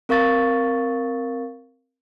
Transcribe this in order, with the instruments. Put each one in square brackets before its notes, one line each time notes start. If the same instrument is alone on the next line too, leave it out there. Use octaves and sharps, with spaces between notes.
[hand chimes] C4 A#4 F5 C#6 A6